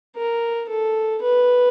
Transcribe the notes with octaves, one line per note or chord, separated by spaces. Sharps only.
A#4
A4
B4